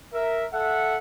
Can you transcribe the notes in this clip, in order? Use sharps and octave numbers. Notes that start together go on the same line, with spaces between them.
A#4 E5
A4 E5 F#5